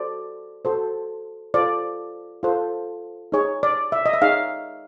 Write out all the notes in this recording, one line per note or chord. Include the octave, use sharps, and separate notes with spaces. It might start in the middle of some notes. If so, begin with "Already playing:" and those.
Already playing: F#4 A4 C5 D5
F#4 A4 C5
F4 A4 C5 D5
F4 A4 C5
D#4 G#4 C#5
D5
E5
D#5
E5
D#4 G#4 C#5 F5